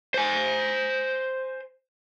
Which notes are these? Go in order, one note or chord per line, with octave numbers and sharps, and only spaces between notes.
C5 G#5